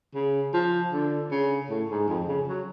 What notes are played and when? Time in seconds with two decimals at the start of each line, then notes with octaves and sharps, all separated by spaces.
0.15 C#3
0.54 F3
0.92 D3
1.31 C#3
1.70 A2
1.90 G#2
2.08 F2
2.27 C#3
2.48 F#3